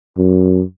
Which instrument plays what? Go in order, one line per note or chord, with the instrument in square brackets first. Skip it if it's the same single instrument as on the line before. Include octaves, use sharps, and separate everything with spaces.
[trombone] F#2